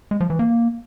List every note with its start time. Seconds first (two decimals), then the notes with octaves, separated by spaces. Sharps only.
0.11 G#3
0.20 F3
0.30 E3
0.39 A#3